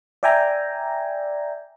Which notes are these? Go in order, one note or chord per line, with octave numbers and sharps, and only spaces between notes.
D5 E5 G5 G#5 A#5